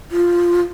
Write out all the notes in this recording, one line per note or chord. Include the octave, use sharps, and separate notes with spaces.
F4